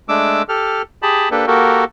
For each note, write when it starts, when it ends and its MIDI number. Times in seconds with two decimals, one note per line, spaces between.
0.09 0.42 56
0.09 0.42 57
0.09 0.42 62
0.09 0.42 86
0.09 0.42 88
0.49 0.82 67
0.49 0.82 69
0.49 0.82 89
1.03 1.29 67
1.03 1.29 68
1.03 1.29 81
1.03 1.29 83
1.31 1.46 58
1.31 1.46 62
1.31 1.46 67
1.31 1.46 69
1.31 1.46 71
1.47 1.84 58
1.47 1.84 66
1.47 1.84 67
1.47 1.84 69
1.47 1.84 70